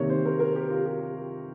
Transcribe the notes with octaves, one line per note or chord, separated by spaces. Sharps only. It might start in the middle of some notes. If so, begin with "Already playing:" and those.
Already playing: C3 D#3 A#3 C#5
C5
A#4
A#4
G4
F4
G4